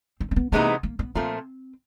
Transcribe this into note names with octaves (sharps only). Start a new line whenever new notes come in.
C4
C4
B3
C3 E3 G#3 A#3 B3 D#4
A#3
B3
A#2 F3 A3 C4